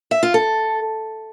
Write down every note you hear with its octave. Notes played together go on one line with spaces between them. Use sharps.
E5
F4
A4